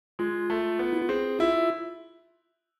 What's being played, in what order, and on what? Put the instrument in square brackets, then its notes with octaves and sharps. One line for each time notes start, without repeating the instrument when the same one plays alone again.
[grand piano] G#3 [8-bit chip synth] F4
[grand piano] A3
B3
[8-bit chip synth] E4
F4
[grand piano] C4 [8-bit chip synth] G#4
[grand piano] E4 [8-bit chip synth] F4